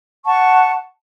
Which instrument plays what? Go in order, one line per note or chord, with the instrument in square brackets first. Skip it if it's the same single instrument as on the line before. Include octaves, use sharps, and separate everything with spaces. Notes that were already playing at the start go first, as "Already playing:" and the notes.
[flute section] F#5 A5 C#6